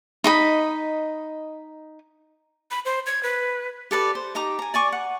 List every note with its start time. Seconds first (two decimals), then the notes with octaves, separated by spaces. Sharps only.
0.24 D#4 D#5 B5
2.71 B5
2.85 C5
3.06 G#6
3.23 B4
3.91 G4 A4 B4 D5
4.15 C5
4.35 D#4 G4 A#5 D6
4.59 G#5 A#5
4.74 D5 G#5 C#6 D6
4.92 F#5